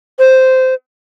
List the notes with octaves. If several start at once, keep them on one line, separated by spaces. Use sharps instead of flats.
C5